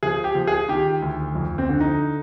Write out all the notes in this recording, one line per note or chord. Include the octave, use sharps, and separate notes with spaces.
F3 G#4
G4
F3
G#4
D#3 G4
D2
F2
C4
D3
D#4